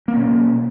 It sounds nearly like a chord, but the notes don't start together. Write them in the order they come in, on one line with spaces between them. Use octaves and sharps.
A#3 C#4 B2 F#3